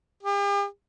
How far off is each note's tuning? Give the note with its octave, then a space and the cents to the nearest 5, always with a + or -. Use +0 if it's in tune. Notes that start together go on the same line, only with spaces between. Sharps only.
G4 +45